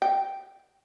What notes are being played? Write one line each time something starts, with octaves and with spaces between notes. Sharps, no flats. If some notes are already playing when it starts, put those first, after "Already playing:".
G5